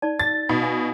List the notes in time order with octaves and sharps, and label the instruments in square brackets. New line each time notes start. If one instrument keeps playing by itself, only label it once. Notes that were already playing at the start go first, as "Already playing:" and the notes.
[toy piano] D#4 D5 A5
[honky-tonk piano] A6
[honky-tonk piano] B2 [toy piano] D#4
[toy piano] F5 G#5 D#6